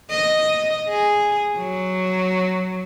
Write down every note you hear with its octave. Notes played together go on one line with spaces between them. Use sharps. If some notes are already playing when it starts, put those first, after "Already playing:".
D#5
G#4
F#3